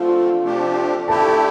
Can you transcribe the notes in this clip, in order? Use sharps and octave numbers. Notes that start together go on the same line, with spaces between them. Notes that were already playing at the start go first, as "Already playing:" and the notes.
Already playing: D3 F3 A3 C4 F4 F5
C3 F3 A3 D4 G4
D3 A3 E4 G4 A4 A5